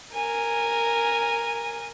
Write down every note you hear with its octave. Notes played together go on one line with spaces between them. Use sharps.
A#4 G#5